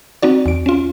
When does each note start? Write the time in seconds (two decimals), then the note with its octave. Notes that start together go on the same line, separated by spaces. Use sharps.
0.23 C4 D#4 F#4 D5
0.46 E2 D7
0.66 C#4 F4